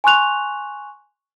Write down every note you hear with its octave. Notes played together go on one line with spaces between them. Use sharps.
G#5 C6 C#6 F#6 F7